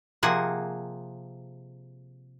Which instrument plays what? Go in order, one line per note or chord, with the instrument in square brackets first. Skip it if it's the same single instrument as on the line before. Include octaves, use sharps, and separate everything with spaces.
[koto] C3 F3 A#3 G#4 F#5